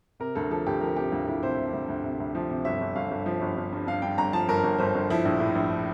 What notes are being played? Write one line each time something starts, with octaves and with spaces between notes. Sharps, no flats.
C3 A#4
D2 A4
F3 A4
D2 G4
F3 A#4
C3 G4
D2 F4
D2 E4
C3 C5
C3
D2
D2
C3
D2
F3
C3
G1 E5
G1
G1 F5
G1
F3
G1
G1
G2
G2 F5
G2 G5
G1 A#5
F3 A5
G1 A#4
G1
G1 C5
G1
F3 E4
A#1
A2
A#1